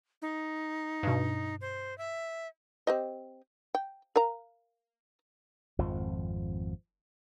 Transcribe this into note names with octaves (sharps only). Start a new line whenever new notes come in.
D#4
G2 B2
C5
E5
C4 G4 D#5
G5
A#4 F5 A#5
G#1 F2 F3